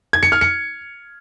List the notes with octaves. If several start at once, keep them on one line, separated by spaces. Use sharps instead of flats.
G#6
C#7
F6
C#7